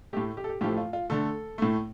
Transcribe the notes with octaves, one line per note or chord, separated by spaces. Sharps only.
A2 A3 G4
G4
A4
G4
A2 F3 A3 G4
F4
F4
D3 A3 A4
A2 A3